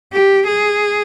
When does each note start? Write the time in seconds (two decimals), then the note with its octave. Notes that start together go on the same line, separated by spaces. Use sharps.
0.14 G4
0.48 G#4